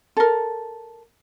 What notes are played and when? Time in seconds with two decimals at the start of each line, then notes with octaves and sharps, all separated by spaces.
0.17 A4 A#4